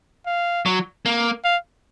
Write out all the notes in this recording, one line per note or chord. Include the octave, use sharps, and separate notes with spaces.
F5
F#3
A#3
F5